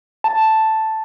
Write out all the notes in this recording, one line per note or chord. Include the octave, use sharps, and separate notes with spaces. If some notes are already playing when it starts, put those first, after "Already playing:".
A5